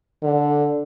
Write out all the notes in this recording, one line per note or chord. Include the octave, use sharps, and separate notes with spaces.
D3